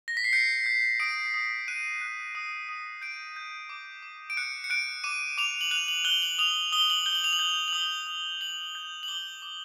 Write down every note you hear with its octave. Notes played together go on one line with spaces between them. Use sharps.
A#6
B6
C7
G6 C#7
G6
D#6 D7
D#6
F#6 D#7
F#6
D#6
D#6
G6 D7
G6
D6
D6
D7
F#6 C#7
C#7
F#6 D7
D6 D#7
D6 F7
F#7
F#6 F7
F#7
F#6 G7
F#7
D#6 F7
D#6 G7
F#7
G6 G7
F#7
F7
F#7
G6
F#7
D#6 G7
D#6
G6 F#7
G6
F#7
D6 G7
D6